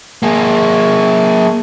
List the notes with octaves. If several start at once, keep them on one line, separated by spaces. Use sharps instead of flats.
A#3 G#4